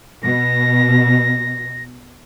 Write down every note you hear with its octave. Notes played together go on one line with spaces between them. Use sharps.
B2 A#6